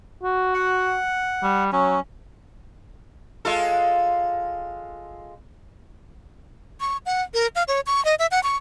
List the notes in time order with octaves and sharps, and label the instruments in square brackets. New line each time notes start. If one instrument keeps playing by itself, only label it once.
[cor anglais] F#4
[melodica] F#5
[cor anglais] G3
[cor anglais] F#3 [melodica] C#4
[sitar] G#3 F4 A4
[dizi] C#6
F#5
A#4
F5
C#5
C#6
D#5
E5
F#5
C#6